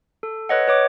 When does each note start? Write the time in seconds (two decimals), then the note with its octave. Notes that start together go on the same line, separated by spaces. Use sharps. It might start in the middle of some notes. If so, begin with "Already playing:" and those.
0.23 A4
0.49 B4 C#5 D#5 F#5
0.68 B4 C#5 D6